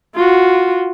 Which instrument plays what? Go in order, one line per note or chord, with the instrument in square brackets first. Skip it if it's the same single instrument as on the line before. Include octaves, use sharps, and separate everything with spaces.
[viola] F4 F#4